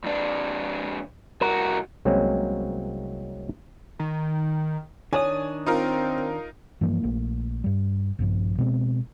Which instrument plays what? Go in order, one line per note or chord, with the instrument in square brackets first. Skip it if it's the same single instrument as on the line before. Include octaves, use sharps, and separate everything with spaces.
[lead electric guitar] F2 D4
[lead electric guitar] C2 F#4 [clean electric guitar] A#4
[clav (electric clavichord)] C2 F#3 G#3 A#3 C4 C#4
[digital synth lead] D#3
[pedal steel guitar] D#3 D4 D#6 [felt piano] C#5 [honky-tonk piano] G#5
[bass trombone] C4 [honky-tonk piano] D#4 F4 A#4
[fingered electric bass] G2 E3 F3 A#3
A#1 A3 A#3
G2 G3
A#1 G2 F3
B2 G#3 B3 C4